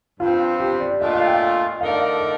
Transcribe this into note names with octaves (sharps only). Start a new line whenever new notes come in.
G2 F3 C4 F4
G4
D5
A#2 A3 D4 F4 D#5
F5
G5
D3 A3 D#4 A#4 D5 F5
D#5